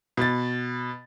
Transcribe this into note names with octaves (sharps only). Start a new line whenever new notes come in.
B2 A6